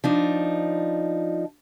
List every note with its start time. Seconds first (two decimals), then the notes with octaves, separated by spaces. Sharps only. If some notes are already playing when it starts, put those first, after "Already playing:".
0.04 F3 D4 D#4